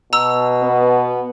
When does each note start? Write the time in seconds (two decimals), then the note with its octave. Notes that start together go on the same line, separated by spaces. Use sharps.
0.13 B2 A#5 E6
0.63 B3